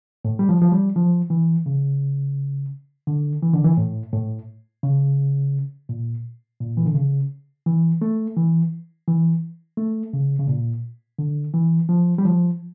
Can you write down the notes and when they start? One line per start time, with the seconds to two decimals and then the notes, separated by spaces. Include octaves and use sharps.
0.25 A2
0.39 G3
0.49 F3
0.61 F3
0.72 G3
0.96 F3
1.30 E3
1.66 C#3
3.07 D3
3.43 E3
3.54 D3
3.64 E3
3.77 A2
4.13 A2
4.83 C#3
5.89 A#2
6.61 A#2
6.77 E3
6.86 D3
6.95 C#3
7.66 E3
8.02 A3
8.36 E3
9.08 E3
9.77 A3
10.13 C#3
10.39 C#3
10.48 A#2
11.19 D3
11.54 E3
11.89 F3
12.18 G3
12.25 F3